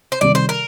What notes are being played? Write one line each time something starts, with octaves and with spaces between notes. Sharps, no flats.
C5
C3 D#3 G3 D5
C5
A#4